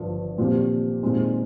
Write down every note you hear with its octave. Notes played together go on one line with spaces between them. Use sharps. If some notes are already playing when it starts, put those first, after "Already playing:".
Already playing: G1 G2 F3
A#2 F3 C4 G4
A#2 G#3 C4 D#4